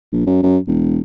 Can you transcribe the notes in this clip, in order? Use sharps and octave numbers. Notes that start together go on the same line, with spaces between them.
A#1
F#2
F#2
E1